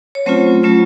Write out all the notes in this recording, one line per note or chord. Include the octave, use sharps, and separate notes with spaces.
C#5
F#3 A3 C4 C#4 F4 C5
F#3 A3 C#4 F4